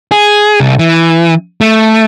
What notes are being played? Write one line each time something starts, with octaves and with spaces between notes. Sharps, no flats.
G#4
C2
E3
A3